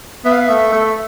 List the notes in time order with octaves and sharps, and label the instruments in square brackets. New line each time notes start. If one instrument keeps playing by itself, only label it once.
[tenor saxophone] B3 [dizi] E5
[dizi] F5
E5
[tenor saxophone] A3
A3